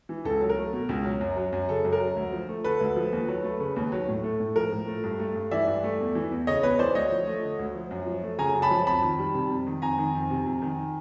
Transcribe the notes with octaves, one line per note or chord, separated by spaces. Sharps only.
E3
C#2 A4
F#3
A#4
A3
B2
C#2
F#3
F#2
F#3
F#2
C#3 A4
F#2
A#4
F#3
D2
F3
A3
D3 A4 B4
D2
F3
D#2
F#3
A3
C#3
D#2
F#3
A2
A3
A2
F3 A#4
A2
A3
G2
A3
G2
E3 D5 E5
G2
A3
E2
E3
E2
C#3 C#5 D#5
E2 B4 C#5
E3 C5 D5
D2 C#5 D#5
F3
A3
D3
D2
F3
F#2
F3
A3
C#3 G#5 A#5
F#2
A5 B5
F3
F2 A5 B5
D#3
G3
C3
F2
D#3
F2 G#5 A#5
D#3
F2
C3
F2
D#3